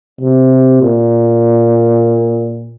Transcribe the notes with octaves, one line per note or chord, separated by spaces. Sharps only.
C3
A#2